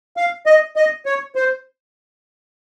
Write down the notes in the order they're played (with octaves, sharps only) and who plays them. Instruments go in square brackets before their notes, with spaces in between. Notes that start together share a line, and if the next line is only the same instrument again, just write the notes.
[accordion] F5
D#5
D#5
C#5
C5